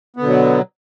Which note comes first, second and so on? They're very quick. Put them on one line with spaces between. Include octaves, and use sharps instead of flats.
B3 D3 B2 F#3